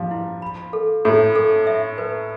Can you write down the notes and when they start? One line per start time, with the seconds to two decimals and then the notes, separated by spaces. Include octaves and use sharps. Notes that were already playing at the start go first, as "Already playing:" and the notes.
Already playing: F3 G3
0.11 E4
0.42 B5
0.73 A4
1.05 A2 A4
1.36 A4
1.67 E5
1.98 B4